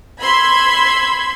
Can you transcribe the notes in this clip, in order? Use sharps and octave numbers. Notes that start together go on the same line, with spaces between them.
B5 C6 E6 G#6